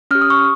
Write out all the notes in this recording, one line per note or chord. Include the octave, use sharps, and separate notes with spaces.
C#4 G4 F6
D#6
C#6